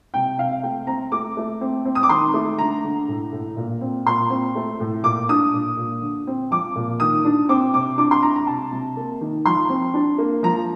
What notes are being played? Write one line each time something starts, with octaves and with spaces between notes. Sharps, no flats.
C3 G5
C3 F5
A3 G5
C4 A#5
A3 D6
A3
C4
C4
D#6
D6
D#3 C6
A3
D3 A#5
D3
A2
A2
A#2
C4
A#2 C6
C4
A3
A2
A#2 D6
D4 D#6
A#2
A#2
D3
C4
F3 D6
A#2
D#3 D#6
D4
C4 D6
C3 D6
D4 D6
C6
D4 A#5
A#5
C3 A5
C3
A#3
D#3
F3 C6
C4
D4
A#3
F3 A#5